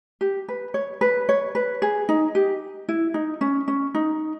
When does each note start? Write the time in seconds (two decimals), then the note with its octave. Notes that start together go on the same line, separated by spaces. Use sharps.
0.21 G4
0.48 B4
0.74 C#5
1.01 B4
1.29 C#5
1.55 B4
1.82 G#4
2.09 D#4
2.35 G4
2.89 E4
3.14 D#4
3.41 C#4
3.68 C#4
3.95 D#4